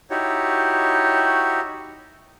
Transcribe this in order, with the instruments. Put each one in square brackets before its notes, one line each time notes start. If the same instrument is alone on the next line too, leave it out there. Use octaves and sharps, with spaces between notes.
[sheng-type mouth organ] D#4 E4 F#4 G4 C#5